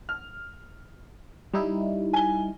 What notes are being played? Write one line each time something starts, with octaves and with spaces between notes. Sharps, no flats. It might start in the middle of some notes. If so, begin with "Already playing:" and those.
F6
G3 D#4 E4
G#5 G7